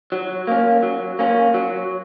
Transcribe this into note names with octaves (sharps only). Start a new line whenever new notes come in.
F#3
A#3 C#4
F#3
A#3 C#4
F#3